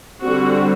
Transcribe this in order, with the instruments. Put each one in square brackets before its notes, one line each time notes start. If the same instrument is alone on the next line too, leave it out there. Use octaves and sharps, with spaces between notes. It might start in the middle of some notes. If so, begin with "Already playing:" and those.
[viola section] D3 G3 C4 F#4